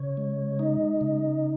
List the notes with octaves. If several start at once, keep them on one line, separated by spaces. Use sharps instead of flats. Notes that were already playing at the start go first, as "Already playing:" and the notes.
Already playing: C#3 C#5
G#3
D#4 D#5
C#3